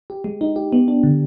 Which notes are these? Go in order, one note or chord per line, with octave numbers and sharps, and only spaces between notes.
G4
G#3
D#4
G4
B3
D4
D3